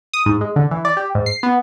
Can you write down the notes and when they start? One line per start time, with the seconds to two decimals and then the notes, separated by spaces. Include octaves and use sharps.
0.13 D#6
0.26 G#2
0.41 G#3
0.56 D3
0.71 E3
0.85 D5
0.97 G4
1.15 G#2
1.26 C7
1.43 B3